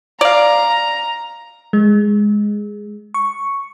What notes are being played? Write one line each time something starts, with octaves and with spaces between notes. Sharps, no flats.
D5 F5 A#5
G#3
C#6